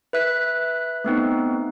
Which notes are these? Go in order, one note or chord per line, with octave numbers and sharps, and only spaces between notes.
B4 E5 F#6 B6
A3 B3 C4 D#4